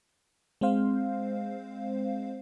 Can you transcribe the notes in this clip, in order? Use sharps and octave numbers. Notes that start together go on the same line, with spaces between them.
G#3 C4 C5 F5